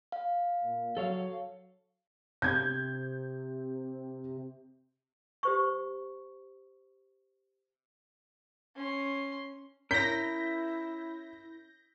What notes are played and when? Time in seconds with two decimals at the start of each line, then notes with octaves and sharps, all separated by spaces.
0.12 F5
0.63 A#2
0.97 F#3 A4 C#5 F5
2.42 C3 G6 G#6
5.43 G4 C5 C#6
8.76 C#4 C6
9.91 C#4 E4 A#4 G6 A#6 B6